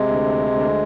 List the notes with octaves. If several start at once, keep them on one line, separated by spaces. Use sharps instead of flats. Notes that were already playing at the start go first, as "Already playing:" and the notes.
Already playing: C3 G#3
D2
D2